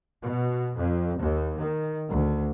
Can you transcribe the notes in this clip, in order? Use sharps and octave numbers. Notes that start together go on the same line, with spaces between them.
B2
F2
D#2
D#3
D2